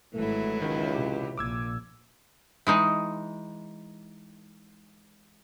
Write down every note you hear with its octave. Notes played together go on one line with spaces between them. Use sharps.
G#1 G#2 E3 F#3 G#3 A3 E4
C#2 D#3
C3 G4
A#1 A#2 D6 E6 G#6
E3 G#3 D#4